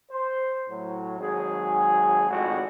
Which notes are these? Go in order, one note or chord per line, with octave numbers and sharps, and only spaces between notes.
C5
A2 F#3
G#1 F#3 G#4
G#1 F2 A2 C3 F#4